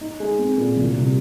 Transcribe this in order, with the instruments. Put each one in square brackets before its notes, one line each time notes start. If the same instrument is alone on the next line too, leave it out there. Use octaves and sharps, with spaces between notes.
[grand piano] D#4
G#3
C4
A#2
C2
C3